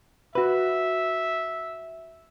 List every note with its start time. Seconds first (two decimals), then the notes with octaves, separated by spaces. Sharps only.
0.35 F#4 B4 E5